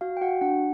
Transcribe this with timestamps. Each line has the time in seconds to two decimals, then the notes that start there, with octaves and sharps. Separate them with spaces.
0.01 F#4 F5
0.17 G5
0.21 F#4 F#5
0.41 D4 F#5